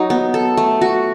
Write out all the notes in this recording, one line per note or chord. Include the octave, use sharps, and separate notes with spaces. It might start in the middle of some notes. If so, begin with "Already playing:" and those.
Already playing: F#3 D#4
B3
A4
A3
F#4